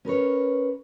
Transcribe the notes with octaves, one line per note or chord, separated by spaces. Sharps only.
C#4 A#4 B4 C#5